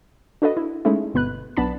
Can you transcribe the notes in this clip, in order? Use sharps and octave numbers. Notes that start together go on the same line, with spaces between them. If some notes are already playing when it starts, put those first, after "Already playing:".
D4 F#4 A4 B4 D#5
E4
G#3 A3 C#4 D#4 E4
G1 B2 B4 F#6
B1 B3 D4 A5 B5